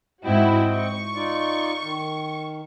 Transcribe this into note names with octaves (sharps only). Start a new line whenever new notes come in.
G#2 C4 E4 F#4 D#5 G5
C#6
D#4 F4 D5
D#3